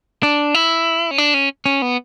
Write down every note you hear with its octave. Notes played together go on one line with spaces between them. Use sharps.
D4
E4
C#4
D4
C#4
C#4
B3